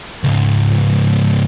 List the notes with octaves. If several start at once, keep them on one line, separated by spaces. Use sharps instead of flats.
C#2 G#2